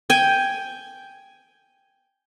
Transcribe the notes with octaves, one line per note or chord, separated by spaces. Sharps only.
G5 G#5